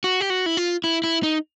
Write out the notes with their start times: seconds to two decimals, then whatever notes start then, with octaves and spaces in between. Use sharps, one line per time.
0.04 F#4
0.21 G4
0.30 F#4
0.46 E4
0.57 F4
0.84 E4
1.03 E4
1.23 D#4